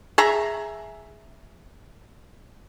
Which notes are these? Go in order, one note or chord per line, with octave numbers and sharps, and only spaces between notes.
G#4 E5 A#5